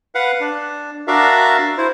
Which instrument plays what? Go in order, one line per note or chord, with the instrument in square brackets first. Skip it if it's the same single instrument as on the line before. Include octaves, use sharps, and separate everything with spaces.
[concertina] B4 F5 F#5
D4
D4 F#4 A#4 D5 E5 F5
E4 C5